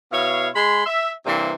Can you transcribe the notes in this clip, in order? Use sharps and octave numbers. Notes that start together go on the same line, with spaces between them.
B2 E4 C#5 F5
G#3 B5 C6
E5
G2 C3 E3 A#3 C5